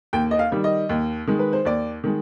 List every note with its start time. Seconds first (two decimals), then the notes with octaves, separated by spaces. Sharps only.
0.13 D#2 G5
0.31 D#5
0.39 F5
0.52 D#3 G3
0.64 D#5
0.89 D#2
1.27 D#3 G#3
1.39 B4
1.53 C5
1.65 D#2 D5
2.04 D#3 G#3